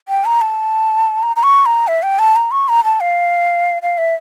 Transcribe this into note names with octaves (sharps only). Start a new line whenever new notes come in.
G5
A#5
A5
A#5
A#5
C#6
A#5
E5
G5
A5
A#5
C#6
A#5
A5
F5
F5
E5